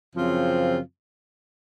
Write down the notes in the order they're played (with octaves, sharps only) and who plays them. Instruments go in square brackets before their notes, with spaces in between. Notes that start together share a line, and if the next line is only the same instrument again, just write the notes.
[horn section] F#2 C#3 F3 C4 F4